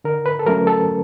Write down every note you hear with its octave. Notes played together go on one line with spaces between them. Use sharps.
D3 A#4
B4
A4
F#3 A3 C#4 A#4
A4